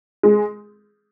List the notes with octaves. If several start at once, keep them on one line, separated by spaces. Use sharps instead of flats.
G#3